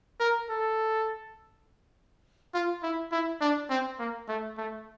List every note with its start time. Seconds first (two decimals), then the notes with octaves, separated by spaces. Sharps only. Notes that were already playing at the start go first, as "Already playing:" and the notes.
0.20 A#4
0.49 A4
2.54 F4
2.83 E4
3.12 E4
3.41 D4
3.70 C4
3.99 A#3
4.28 A3
4.58 A3